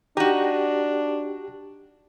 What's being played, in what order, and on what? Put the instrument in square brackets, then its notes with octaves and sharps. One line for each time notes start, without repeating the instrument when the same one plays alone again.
[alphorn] D4 [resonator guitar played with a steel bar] D#4 F#4 [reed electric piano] G4